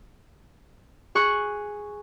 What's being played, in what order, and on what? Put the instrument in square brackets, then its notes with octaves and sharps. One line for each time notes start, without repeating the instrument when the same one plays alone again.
[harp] G#4 C#6 F#6